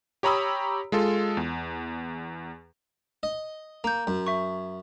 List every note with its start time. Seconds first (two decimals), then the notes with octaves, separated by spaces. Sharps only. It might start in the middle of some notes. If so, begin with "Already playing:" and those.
0.23 G4 C#5 A#5 B5 D#6 E6
0.92 G#3 F4 A4
1.37 E2
3.23 D#5
3.84 A#3 A#5 G6
4.07 F#2
4.27 E5 C#6